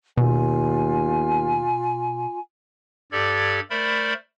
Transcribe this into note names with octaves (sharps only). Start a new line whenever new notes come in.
D#2 B2 F4 G#5
G2 G4 A4 D5 G#6
A3 A#4 C5 D5 B5